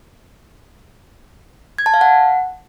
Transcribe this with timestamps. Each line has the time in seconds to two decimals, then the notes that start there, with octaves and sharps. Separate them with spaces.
1.78 G#6
1.86 A5
1.94 F5
2.01 F#5